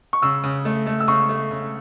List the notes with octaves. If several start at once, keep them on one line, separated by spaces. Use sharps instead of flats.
C#6
C#3 E6
C#3
A3
A3
E6
C#3 C#6
A3
C#3